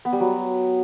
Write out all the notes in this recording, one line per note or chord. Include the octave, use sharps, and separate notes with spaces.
B3
G3
F#3